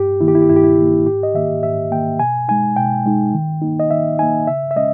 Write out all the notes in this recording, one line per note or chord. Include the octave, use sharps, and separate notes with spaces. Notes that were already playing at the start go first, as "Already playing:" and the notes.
Already playing: G2 G4
D#3 A#3 E4
G4
E4
G4
G2 E4
G4
E4
D#3 A#3
G#2 G4
D#5
D#3 A#3 E5
G#2 E5
D#3 A#3 G5
B2 G#5
G#3 D#4 G#5
B2 G5
G#3 D#4
D#3
A#3 D#4
D#5
D#3 E5
A#3 D#4 G#5
C#3 E5
E5
G#3 C#4 D#5